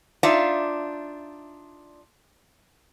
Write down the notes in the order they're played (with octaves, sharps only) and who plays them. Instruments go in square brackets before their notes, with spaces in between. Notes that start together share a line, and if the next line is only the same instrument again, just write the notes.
[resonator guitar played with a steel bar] D4 D#4 F4 E5 F5